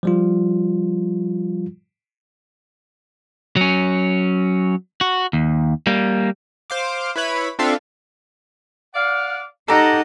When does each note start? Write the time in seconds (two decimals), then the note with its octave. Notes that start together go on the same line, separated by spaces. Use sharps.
0.03 F3 G3 F4
3.56 F#3 C#4
5.01 F#4
5.33 D#2
5.87 G3 A#3
6.70 C5 F5 D6
7.16 E4 B4 C#5 B5
7.59 C4 D4 F4 A4 E5 F5
8.95 D5 F5 F#5
9.68 D#4 G4 A4 D#5 F#5 A#5